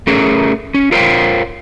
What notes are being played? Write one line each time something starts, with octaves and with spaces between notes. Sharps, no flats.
A3 C#4 G#4 A#4
C#4
F4 A#4 C5 C#5 F5 G5